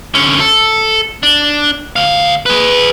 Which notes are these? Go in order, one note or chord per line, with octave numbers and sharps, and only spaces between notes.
D3 C#4
A4
D4
D2 F5
G#4 B4